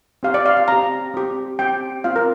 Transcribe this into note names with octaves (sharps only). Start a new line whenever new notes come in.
C4 G4 F5
D5
F5
F5
C4 G4 A#5
C4 G4
C4 G4 G5
C4 F4 F5
A#4